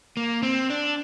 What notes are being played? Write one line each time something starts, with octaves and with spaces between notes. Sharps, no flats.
A#3
C4
D4